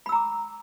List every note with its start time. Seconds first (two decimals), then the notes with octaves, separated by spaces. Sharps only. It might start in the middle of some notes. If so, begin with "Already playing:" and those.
0.06 B5
0.09 E6
0.12 A#5
0.15 D6